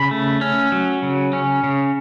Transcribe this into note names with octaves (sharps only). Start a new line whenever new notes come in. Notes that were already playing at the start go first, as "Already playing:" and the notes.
Already playing: C#3 B5
A3
C#4
F#3
C#3
C#4
C#3